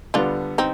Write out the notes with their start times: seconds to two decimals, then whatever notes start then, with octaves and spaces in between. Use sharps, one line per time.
0.14 D3 G3 B3 D4 F4
0.58 C4 D#4